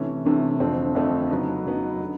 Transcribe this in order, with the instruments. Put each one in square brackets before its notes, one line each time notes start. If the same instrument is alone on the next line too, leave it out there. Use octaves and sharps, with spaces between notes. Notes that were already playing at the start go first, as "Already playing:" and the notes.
Already playing: [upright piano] C3 E3 A3 C#4
C3 E3 A3 C#4
F2 D3 F3 A3 C4
F2 D3 F3 A3 C4
C#3 F#3 B3 D#4
C#3 F#3 B3 D#4
D3